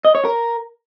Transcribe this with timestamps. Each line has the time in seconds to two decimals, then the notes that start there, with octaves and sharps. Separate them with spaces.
0.05 D#5
0.15 C#5
0.25 A#4